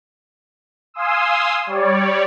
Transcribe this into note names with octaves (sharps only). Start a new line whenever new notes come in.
F5 G#5 C6 D#6 E6
G3 C#5 D5